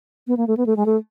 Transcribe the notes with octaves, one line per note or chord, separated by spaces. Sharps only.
B3
A#3
A3
B3
A3
G#3
A3